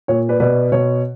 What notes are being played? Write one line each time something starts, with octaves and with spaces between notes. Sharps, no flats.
A#2 C#5
B4 D5
B2 B4 D5
B2 C#5